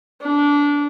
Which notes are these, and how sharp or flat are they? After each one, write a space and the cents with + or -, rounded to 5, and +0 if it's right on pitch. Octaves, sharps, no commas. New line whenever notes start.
D4 -20